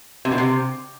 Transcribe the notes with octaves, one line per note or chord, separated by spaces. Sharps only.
C3
B2
C3